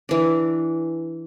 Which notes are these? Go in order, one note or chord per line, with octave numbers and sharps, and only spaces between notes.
E3 D4